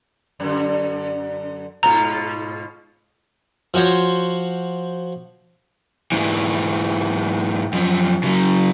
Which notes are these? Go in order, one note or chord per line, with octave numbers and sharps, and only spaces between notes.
F#2 D3
G#2 B2 F4 A#5
F3 F#4 C5 C#5
G#2 E3
F#2 F3
C#3 F#3